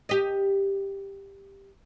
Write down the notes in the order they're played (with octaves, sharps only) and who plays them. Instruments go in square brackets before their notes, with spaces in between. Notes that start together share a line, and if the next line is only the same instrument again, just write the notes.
[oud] G4 D#5